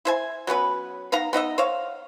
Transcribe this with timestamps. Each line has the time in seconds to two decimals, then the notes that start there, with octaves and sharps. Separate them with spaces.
0.05 E4 C5 G#5
0.47 F#3 B3 C#4 B4
1.12 B3 D#4 F5 A#5
1.33 B3 D#4 D#5 E5
1.58 C5 C#5 F5